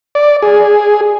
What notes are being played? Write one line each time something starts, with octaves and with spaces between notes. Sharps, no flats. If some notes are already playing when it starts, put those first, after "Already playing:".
D5
G#4